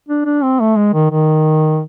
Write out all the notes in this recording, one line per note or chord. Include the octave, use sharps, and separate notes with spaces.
D4
D4
C4
A3
G#3
D#3
D#3